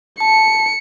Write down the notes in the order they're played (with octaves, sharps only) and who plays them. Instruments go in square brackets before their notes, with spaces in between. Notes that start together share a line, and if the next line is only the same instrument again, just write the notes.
[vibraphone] A5 [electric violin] C#7